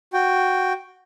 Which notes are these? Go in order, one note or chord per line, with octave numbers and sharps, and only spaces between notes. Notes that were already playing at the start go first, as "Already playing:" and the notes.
F#4 G5